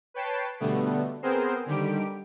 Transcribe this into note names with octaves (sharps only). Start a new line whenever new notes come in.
B4 C#5 G5 A5 C7
B2 D3 G3 A3 B3
B3 C4 G#4 A#4 C5
D3 D#3 G3 G4 D7